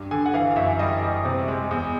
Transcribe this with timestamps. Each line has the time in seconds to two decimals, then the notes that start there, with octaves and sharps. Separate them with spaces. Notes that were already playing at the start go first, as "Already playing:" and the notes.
Already playing: G2
0.11 D3 G#5
0.26 F#5
0.34 E3 F5
0.51 F5
0.56 F#2 E5
0.79 G3 D#5
1.02 G3
1.25 C3
1.48 G#3
1.71 E2